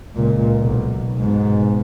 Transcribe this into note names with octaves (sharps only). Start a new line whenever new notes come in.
C#2 A#2
B1
G#2 B2